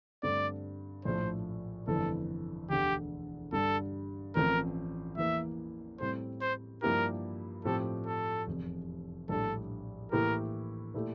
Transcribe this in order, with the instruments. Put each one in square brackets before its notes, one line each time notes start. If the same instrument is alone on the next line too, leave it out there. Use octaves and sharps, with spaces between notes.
[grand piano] G2 D3 A3 C4 [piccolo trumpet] D5
[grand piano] A#1 A2 F3 A3 [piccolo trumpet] C5
[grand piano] G1 F2 E3 A3 [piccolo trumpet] A4
[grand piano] E1 D2 D3 [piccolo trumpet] G4
[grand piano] G2 D3 G3 [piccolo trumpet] A4
[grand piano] A1 A2 F3 C4 [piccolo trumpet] A#4
[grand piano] E2 E3 A#3 [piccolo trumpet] E5
[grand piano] A2 G3 C4 E4 A4 [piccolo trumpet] C5
[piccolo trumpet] C5
[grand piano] G2 F3 A#3 E4 G4 [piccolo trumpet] A#4
[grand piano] A2 F3 C4 G4 [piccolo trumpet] A4
[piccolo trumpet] A4
[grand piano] F1 E2 C3
[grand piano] A#1 A2 G3 D4 [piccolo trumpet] A4
[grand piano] A2 E3 A#3 E4 G4 [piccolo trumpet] A#4
[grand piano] A#2 A3 E4 G4